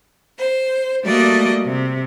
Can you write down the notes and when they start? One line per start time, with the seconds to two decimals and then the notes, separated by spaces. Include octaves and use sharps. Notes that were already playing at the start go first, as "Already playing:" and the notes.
0.38 C5
1.03 G3 A3 A#3 F#4 D5 D#5
1.65 C3